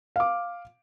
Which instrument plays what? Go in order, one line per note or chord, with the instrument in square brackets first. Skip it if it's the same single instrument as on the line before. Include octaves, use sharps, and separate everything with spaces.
[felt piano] F5 D6